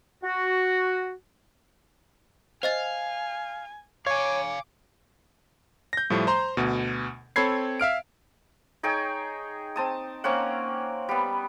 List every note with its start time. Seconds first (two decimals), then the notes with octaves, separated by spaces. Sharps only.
0.23 F#4
2.63 C5 D#5 F5 G#5 A6
4.06 C#5 F5 G#5 D6
5.93 G6 A#6
6.10 A2 F3 G3 A3
6.27 C5 A#5 C6
6.57 D2 B2
7.36 C4 A4 C#5 B5 G#6 C7
7.80 E5 F5 F6 D7
8.83 D#4 G#4 C#5 G5
9.76 C4 A5 D#6
10.24 A#3 C4 C#4 F#5
11.09 G3 B3